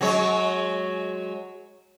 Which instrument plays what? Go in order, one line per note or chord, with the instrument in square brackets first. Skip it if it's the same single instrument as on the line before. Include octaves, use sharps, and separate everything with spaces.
[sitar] F#3 G#3 C#5